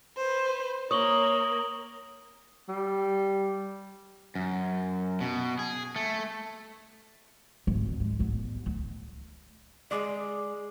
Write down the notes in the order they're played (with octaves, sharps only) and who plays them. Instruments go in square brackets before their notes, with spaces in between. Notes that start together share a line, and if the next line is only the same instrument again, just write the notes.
[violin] B4 C5
[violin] A#3 [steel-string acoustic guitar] C#5 [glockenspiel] D#6 F#7 G7
[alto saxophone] G3
[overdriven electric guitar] F#2
B2
G#4
A3
[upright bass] G#1 D2
G#3
A1 B3
D2
[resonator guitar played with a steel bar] G#3 D5 [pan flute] G#4